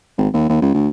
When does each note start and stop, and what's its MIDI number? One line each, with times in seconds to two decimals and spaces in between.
0.18 0.28 32
0.33 0.45 39
0.49 0.62 39
0.62 0.73 37
0.74 0.88 38